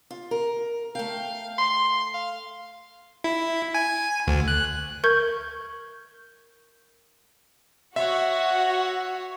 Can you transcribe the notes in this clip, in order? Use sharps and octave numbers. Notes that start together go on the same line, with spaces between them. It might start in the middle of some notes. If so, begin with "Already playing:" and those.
F4
A#4
A3 F5 G5
C6
F5
E4
G#5
D2
F#6
A#4 C#6 G6 G#6
F#4 C#5 E5 F#5